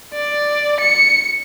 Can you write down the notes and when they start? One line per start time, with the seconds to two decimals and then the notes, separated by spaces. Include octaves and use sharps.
0.14 D5
0.80 C#7